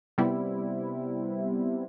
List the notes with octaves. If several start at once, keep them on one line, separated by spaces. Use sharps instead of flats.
C3 G3 B3 E4